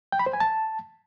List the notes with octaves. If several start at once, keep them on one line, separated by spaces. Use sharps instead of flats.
G5
B5
C5
G#5
A5